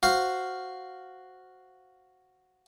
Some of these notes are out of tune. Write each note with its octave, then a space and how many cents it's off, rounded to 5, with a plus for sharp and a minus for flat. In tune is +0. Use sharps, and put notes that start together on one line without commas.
F#4 +0 C5 +0 F5 +0